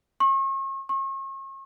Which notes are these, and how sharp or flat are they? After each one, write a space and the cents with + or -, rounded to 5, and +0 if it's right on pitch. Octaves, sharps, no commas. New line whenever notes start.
C#6 -40
C#6 -40